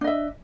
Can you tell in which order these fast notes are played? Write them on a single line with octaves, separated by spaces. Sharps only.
D4 D#5 E5